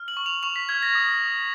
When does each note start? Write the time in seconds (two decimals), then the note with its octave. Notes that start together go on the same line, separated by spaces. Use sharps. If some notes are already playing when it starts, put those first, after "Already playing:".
Already playing: F6
0.08 F#7
0.17 C#6
0.26 F7
0.43 C#6 F7
0.56 B6
0.69 F6 G#6
0.83 A#6
0.95 D#6
1.21 D#6